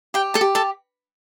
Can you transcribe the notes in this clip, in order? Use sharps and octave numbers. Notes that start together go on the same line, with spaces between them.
G4 G5
A4 A5
G4
A4 A5